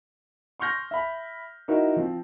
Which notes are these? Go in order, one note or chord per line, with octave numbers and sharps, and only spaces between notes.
C6 C#6 F6 G6 A#6
E5 B5
D#4 E4 F#4 A#4
F3 C4